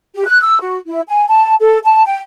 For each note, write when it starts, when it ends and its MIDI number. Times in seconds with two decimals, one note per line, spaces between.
0.15 0.27 67
0.27 0.41 90
0.42 0.58 88
0.60 0.77 66
0.87 1.01 64
1.08 1.26 80
1.28 1.55 81
1.60 1.79 69
1.85 2.03 81
2.05 2.19 79